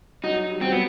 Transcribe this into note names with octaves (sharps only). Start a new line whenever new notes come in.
F#3 D#4
G3
F#3 C4
B3